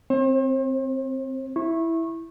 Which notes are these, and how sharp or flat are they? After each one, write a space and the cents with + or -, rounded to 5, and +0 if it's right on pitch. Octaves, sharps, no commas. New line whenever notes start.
C4 +0 C5 +45
E4 +0 C#6 -25